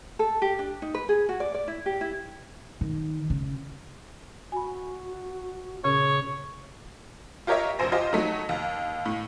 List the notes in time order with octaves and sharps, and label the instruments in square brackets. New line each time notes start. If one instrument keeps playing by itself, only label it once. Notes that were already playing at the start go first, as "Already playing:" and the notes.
[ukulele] A4
G4
D4
D#4
B4
G#4
F#4
D5
D5
E4
G4
E4
[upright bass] D#3
C#3
[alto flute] F#4 [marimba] G#5 B5
[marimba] A#2 C#3 C#4 [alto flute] G#4 [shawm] C#5
[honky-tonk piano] F4 G4 A#4 C#5 D#5 E5
F1 A#1 C5 G#5 A#6
F4 G4 C5 D#5
F#3 A3 D#4
D#2
A2